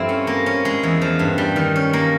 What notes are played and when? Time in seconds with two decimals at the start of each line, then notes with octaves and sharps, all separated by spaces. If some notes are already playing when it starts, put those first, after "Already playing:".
Already playing: G2 F3 A3 C4 E4
0.09 C#4
0.27 A#3
0.46 C#4
0.65 G#3
0.83 E2
1.02 F3
1.19 G2
1.38 G3
1.56 D#3
1.76 C#4
1.93 A#3